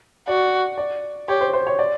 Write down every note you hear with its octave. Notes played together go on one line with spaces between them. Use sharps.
F#4 D5
D5
G4 C#5
C5
C5
C#5
D5